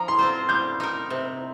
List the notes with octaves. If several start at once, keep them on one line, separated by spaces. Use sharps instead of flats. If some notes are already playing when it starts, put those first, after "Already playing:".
Already playing: F3 A#5
C6
C4 F4 C5
G3 G6
D#4 A#4
C3